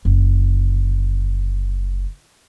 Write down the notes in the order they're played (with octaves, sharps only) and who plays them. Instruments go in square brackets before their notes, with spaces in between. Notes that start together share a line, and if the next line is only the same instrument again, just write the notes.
[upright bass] F#1 D3